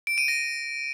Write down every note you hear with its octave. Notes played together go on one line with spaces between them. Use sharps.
D7
D#7
A#6